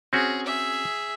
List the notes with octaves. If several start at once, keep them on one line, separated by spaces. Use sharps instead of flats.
C4 C#4 F#4 G#4
G#4 E5